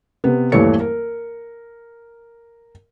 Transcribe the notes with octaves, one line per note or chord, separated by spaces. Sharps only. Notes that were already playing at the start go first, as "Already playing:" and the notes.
C3 B3
D#1 G2 E3 A3 C#5 C#7
A#4